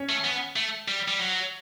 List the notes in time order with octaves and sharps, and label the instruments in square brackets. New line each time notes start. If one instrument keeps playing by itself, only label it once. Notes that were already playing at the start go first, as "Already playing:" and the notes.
Already playing: [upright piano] C#4 C#5
[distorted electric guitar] A3
B3
A3
G3
G3
F#3